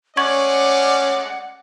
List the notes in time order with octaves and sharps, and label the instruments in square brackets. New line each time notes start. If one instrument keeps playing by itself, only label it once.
[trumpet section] G#3 A3 D5 [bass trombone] C#4 [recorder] F#5 [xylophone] C#6 G#6 F#7